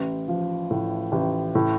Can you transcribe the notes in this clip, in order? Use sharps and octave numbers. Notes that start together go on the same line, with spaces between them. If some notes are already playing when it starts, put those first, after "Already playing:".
Already playing: A1
F3
A2
A1
A2